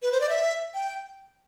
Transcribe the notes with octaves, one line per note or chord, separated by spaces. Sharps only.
B4
C5
D5
E5
G5